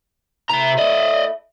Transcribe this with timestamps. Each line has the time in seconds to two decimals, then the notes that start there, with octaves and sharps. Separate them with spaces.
0.49 C3 A3 E4 A4 A#5
0.78 D5 D#5